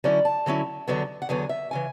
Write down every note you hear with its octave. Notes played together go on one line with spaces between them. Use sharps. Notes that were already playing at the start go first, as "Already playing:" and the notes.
D3 F#3 C#4 E4 D5
A5
D3 F#3 C#4 E4
E2 D3 F#3 B3
F#5
E2 D3 F#3 B3 G#5
E5
C#3 E3 G#5